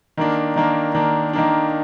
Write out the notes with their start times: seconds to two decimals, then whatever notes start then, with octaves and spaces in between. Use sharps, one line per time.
0.17 D#3 A#3 D4
0.56 D#3 A#3 D4
0.94 D#3 A#3 D4
1.33 D#3 A#3 D4